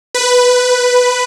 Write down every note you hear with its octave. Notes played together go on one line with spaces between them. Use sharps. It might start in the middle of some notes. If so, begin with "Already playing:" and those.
B4